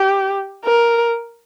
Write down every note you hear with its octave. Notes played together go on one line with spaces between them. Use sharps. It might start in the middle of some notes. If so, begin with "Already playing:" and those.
Already playing: G4
A#4